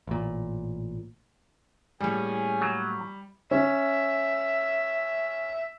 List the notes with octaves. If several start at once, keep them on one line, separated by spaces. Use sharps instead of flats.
A1 A#2
A2 G3 A#3 C#4 G#4 G#5
F#3
C#4 E5